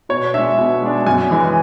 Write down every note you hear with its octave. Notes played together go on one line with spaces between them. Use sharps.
B2 C#5
G#3 D4 E5
B2
G#3 D4
F#2 G#5
E3 G#3